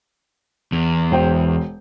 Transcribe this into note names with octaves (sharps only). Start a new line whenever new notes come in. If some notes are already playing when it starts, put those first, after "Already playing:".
E2
E1 C5 G5